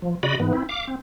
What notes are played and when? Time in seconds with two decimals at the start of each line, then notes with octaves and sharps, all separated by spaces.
0.02 F3
0.23 C#3 F#4 D5 D#5 B5
0.40 G#2 E3 B3
0.53 C4 E4
0.69 F5 D6
0.87 C4